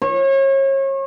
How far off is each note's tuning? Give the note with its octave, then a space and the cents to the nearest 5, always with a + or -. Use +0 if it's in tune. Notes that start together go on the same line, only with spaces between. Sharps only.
C#5 -35